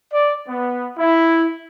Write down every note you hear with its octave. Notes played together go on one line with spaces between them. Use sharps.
D5
B3
E4